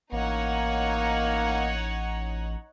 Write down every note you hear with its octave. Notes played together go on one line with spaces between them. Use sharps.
A1 A#3 D#4 C#5 F#5